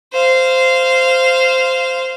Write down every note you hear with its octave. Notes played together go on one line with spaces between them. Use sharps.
C5 F5